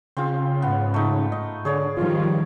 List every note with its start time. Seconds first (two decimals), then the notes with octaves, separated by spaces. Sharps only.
0.17 C#3 C4 F4
0.62 G#2 B3
0.94 A3 D#4
1.32 D#5
1.65 D3 G#4 C#5 D5
1.97 D#3 F3 G3 F4